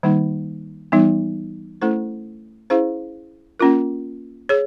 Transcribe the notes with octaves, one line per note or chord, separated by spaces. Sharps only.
D#3 G3 A#3 D#4
E3 G3 B3 D#4
A3 C#4 E4 A4 C5
C#4 E4 G#4 C5 F5
A#3 C#4 F4 A#4
G#4 C#5